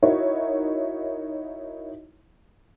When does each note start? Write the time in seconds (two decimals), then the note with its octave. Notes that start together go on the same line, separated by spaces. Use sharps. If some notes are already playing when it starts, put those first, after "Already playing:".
0.03 D#4 E4 F#4 A#4 C#5 E5